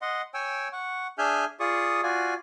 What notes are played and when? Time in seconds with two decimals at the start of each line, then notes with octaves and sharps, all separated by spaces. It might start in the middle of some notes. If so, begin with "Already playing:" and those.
0.02 D#5 F#5 C6
0.34 C#5 G5 G#5 E6
0.73 F#5 C#6
1.18 D4 G#4 E5 G#5 F6 G6
1.60 F4 G#4 D5 C#6 D#6
2.03 F4 F#4 D5 G#5